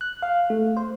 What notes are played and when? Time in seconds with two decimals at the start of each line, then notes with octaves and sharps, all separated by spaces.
0.01 F#6
0.22 F5
0.50 A3
0.77 C5